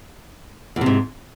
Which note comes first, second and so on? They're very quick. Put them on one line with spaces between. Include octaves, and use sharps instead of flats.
E2 C3 G#2